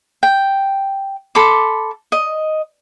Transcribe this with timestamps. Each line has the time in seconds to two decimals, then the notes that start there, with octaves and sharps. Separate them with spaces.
0.23 G5
1.35 A4 B5 C6 D6
2.12 D#5